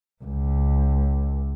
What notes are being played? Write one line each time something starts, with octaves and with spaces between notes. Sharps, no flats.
C#2